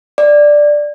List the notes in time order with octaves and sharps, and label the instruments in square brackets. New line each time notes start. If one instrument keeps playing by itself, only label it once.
[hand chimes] D5